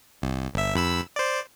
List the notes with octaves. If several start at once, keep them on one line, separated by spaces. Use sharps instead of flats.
C2
G1 E5
F2 B5 E6
C5 D5